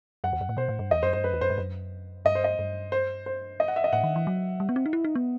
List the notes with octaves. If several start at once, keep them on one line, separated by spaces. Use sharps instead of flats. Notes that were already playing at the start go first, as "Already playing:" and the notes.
F#2 F#5
E2
F#2
A2
B2 C5
A2
G2
E2 D#5
F#2 C5
G2 C5
F#2 B4
E2
F#2 C5
G2
F#2
G2 D#5
C5
D#5
G2
C5
C5
D#5
F#5
E5
D#5
A2 F#5
D#3
E3
F#3
G3
B3
C4
D#4
E4
D#4
B3